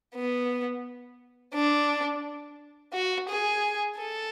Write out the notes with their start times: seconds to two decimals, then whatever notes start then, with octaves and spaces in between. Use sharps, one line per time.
0.15 B3
1.54 D4
2.93 F#4
3.29 G#4
3.99 A4